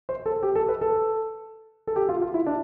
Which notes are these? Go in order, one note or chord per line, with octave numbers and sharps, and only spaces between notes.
C5
A4
G4
A4
B4
A4
A4
G4
F4
F4
E4
D4